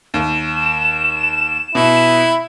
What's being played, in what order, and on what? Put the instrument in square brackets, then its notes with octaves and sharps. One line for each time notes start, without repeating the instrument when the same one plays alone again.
[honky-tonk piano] D#2 [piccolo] E7
[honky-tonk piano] B2 [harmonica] E4